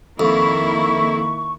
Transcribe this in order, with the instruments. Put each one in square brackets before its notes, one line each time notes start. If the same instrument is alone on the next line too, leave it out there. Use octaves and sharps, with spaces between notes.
[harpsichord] F2 [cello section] D#3 A#3 E4 [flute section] C#6